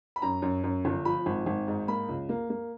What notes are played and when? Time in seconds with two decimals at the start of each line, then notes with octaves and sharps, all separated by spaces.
0.16 B5
0.22 F#2 A#5
0.42 F#2
0.64 F#2
0.85 G1
1.05 F3 B5
1.26 G#1
1.46 G#1
1.68 G#2
1.88 A#3 B5
2.09 C#2
2.29 A#3
2.50 A#3